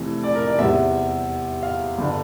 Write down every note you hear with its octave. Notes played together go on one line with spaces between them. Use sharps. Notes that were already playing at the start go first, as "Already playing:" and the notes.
Already playing: F1 F2 E3 A3
D5
A#4
D5
E2 C3 G3 E5
F5
G1 D3